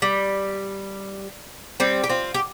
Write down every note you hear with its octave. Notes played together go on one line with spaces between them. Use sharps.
G3
G3 C4
G4
C4 F4
G4